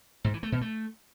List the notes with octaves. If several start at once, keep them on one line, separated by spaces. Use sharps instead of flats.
G#2
E3
A3
B2
A3